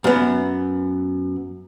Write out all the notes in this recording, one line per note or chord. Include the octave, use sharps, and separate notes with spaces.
F#2 B3